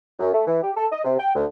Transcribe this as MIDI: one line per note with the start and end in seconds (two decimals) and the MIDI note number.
0.19 0.33 42
0.34 0.46 57
0.47 0.60 52
0.63 0.71 67
0.77 0.86 69
0.92 1.03 75
1.05 1.14 48
1.19 1.32 79
1.35 1.45 38